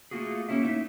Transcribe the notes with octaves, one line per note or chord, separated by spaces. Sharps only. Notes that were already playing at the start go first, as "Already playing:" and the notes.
A3 A#3 F4 F#4 G#4
A#3 B3 C#4 E4 E5
A3 D#4 E5